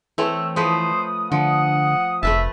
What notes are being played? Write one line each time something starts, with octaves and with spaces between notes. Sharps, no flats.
E3 A3 C4 C#5 E6
F3 A3 B4 C5 D#6
D3 F3 F#5
F1 A3 B4 E5 A5